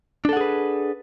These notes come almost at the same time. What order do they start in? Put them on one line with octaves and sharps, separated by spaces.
D4 A4 F#5 G#4 B4